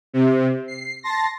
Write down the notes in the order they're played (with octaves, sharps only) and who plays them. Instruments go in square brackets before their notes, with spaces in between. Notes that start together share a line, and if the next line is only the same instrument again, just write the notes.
[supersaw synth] C3
C7
A5 C6 A#6